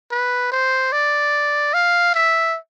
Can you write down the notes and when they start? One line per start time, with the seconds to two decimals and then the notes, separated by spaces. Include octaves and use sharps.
0.11 B4
0.52 C5
0.92 D5
1.74 F5
2.15 E5